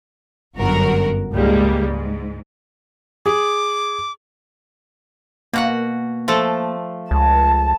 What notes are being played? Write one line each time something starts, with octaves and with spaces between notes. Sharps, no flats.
G1 F#2 F#4 A#4
C#2 G#2 G3 G#3 A#3
G#2
G#4 D6
B2 A#3 F#4 F#5
F3 A3 A4
C#2 A5